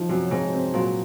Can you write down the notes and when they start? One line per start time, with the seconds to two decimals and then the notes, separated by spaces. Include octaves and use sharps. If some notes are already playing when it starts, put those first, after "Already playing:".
Already playing: F3 D#4
0.09 F#2 C3
0.31 G#2 C3
0.53 C4
0.74 A#2 F#3